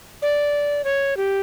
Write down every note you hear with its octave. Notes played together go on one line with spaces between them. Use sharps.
D5
C#5
G4